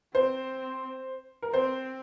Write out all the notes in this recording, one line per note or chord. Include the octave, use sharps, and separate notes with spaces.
C4 C5
A#4
C4 C5